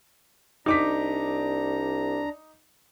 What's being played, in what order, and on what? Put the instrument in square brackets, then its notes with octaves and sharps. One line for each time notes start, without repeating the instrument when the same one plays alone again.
[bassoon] C2 [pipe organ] D4 A#5 [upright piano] D#4 D6 B6